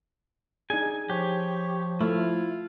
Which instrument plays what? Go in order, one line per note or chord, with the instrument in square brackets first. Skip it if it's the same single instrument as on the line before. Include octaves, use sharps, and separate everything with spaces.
[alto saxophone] D4 [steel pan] D#4 G#4 [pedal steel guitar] G#5
[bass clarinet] F3 [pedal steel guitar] G4 [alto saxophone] C#5
[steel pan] A3 [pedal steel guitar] E4 [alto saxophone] F4